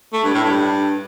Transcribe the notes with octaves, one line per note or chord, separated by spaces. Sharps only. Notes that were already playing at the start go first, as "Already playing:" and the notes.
A3
G2
A2
G2